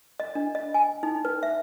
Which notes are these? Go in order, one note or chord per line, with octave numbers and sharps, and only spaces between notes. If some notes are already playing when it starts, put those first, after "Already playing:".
D#5
D4
D#5
G#5
D#4
B4
E5